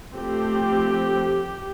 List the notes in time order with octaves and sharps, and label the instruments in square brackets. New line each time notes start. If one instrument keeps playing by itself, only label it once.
[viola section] F3 A3 C4 G4